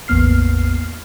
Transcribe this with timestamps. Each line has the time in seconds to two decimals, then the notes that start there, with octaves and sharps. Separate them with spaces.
0.08 A1 E2 A#3 B3 F6 C7